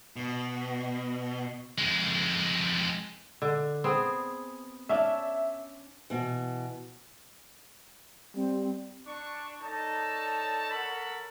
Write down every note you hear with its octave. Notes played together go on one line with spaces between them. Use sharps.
B2
F2 G#3
D3
B3 C4 G#4
C#4 D4 E5
B2 E3
G3 C4
D4 C#6
D#4 A4 C#5 D5 A5
A4 A#4 C#5 F#5 A5 B5